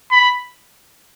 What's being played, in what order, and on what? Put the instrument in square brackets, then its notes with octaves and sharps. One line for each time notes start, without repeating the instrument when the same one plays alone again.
[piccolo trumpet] B5